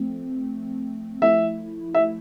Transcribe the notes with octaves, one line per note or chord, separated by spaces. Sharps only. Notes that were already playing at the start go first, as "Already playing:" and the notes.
Already playing: F3 A3 C4
F3 A3 E4 E5
E5